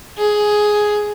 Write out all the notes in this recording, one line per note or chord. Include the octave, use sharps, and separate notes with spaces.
G#4